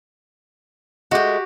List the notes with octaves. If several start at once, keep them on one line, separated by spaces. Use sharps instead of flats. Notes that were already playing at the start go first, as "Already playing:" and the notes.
G#3 A3 F#4 G4